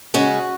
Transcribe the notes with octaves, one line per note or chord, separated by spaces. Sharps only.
C#3 G#3 C#4 F#4